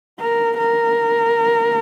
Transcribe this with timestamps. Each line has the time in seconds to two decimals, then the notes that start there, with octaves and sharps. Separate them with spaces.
0.20 A#4
0.58 A#4